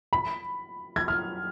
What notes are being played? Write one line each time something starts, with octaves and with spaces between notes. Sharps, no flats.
B5
G#6
F6